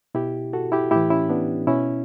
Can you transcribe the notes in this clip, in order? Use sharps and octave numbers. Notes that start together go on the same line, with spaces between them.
B2 E4 G4
F#4 A4
E4 G4
A2 E3 E4 G4
C#4 E4
B3 D4
B2 C#4 E4